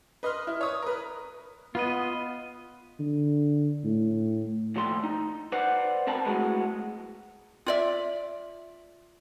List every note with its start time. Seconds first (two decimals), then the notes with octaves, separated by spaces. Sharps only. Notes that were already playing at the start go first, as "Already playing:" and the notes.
0.23 B4 D#5 C6 F6
0.47 E4
0.61 C#5 D#6
0.83 A#4 B4
1.75 B3 F4 D#5
3.00 D3
3.84 A2
4.76 D#2 F3 G3 A3 C6
5.04 D#4
5.52 B4 C5 D5 F#5
6.07 B3 C4 A#4 G5 A5 B5
6.25 A2 F#3 G#3 B3
7.66 F4 D5 E5